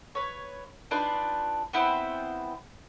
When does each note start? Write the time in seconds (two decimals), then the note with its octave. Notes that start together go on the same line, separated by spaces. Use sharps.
0.15 B4 C#5
0.91 D4 D#4 F4 B4
1.73 B3 C4 E4 C5